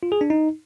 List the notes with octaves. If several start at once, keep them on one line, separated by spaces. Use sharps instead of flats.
F4
G#4
D4
D#4